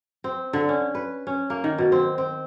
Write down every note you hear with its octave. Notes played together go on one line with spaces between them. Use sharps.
C4
D3
C#4
B4
C#4
A#3
D#3
B2
C4
C4